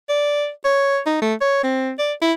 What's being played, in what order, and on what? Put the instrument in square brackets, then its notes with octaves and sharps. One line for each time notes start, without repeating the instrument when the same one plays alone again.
[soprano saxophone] D5
C#5
D#4
A3
C#5
C4
D5
E4